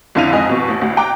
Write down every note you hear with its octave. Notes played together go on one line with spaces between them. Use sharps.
F2 D3 E4 F5 D#7 F7
F2 G#2 D#5 G#5
F2 B2
A1
D2
G5 A#5 D6 F#6